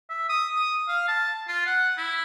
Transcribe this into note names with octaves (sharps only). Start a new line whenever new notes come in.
E5
D#6
D#6
F5
A5
F4
F#5
E4